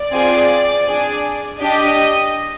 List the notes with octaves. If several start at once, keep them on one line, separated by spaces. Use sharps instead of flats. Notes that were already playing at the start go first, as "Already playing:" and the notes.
Already playing: D5
C4 F4 G#4
D4 G#4
D4 G4 D#5